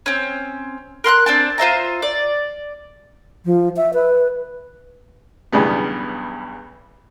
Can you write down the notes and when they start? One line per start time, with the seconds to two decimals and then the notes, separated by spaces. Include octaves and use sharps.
0.06 C4 C#4
1.04 A#4 C6 F6 F#6
1.26 C4 D4 A5
1.58 F4 C5 E5 A#5
2.02 D5
3.45 F3
3.77 E5
3.93 B4
5.52 B1 E2 G2 C#3 B3